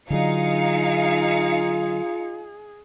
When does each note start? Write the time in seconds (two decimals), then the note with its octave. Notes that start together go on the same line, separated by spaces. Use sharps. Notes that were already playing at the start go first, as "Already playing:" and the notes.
0.10 D3 F#3 D#4 F4 G#4 F5 C#7